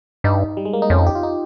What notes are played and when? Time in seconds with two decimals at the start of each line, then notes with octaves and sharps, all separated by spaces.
0.24 G2 D#4
0.57 G3
0.65 G#3
0.73 A#3
0.82 D#4
0.90 F2 C#4
0.98 D#4
1.07 G4
1.15 F4
1.23 D#4